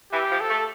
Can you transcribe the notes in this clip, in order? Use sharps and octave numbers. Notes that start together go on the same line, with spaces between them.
E3 G4
F3
A4
A3